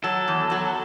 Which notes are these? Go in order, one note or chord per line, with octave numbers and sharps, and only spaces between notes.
F#3 A4
E2
F#3